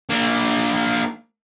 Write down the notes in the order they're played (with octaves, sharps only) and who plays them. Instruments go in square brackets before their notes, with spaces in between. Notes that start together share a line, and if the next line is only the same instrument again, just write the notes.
[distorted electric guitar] A#3 D4